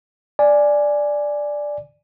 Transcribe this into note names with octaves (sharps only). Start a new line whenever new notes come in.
D5 G#5